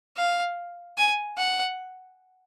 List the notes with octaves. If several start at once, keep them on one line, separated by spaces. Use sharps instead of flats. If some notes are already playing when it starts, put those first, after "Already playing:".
F5
G#5
F#5